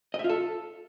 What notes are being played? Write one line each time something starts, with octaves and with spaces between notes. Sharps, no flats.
D#5
E5
F4
A4